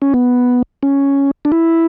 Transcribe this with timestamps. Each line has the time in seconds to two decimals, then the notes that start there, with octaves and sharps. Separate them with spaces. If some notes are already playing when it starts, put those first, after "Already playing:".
0.02 C#4
0.14 B3
0.83 C#4
1.45 D4
1.52 E4